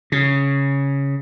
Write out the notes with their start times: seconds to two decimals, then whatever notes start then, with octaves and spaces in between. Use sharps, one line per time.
0.12 C#3